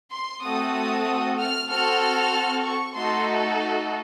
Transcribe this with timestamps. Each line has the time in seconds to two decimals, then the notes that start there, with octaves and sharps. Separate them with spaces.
0.11 C6
0.43 A3 C4 F#4 A4 D#6
0.75 D#6
1.38 F6
1.69 C4 F#4 A4 F6
2.64 C#6
2.95 A3 D#4 F#4 A4 C6